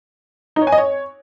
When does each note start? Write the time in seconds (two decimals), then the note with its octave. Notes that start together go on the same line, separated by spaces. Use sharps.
0.56 D#4
0.62 C#5
0.67 G#5
0.72 D#5
0.78 C#5